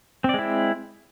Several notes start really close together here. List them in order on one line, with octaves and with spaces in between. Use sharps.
C4 D5 G#3 E4